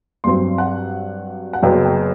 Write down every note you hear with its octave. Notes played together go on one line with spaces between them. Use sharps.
G2 F#3 C4 C6
F#5
F#5
F#1 F#2 F#3 B3 G5
G5